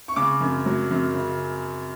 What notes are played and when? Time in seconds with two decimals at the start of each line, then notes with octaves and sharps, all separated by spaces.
0.08 C#6
0.16 C#3 D6
0.41 F#2
0.66 F#3
0.91 F#2
1.14 C#3